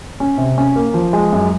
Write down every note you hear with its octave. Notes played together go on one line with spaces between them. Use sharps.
C#4
C3
C#4
A#3
F3
G#3
F#2